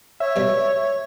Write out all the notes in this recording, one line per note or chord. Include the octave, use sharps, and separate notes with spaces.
C#5 E5
B2 G3